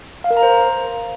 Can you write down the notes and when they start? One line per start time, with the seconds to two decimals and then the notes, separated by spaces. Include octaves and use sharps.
0.24 F5
0.30 A#4
0.37 A#5
0.43 C5